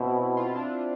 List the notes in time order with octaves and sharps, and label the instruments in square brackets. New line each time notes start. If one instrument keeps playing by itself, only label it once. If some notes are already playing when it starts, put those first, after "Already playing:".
Already playing: [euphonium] B2 [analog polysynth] C4 E4
[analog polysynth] F4
E4
D4 F4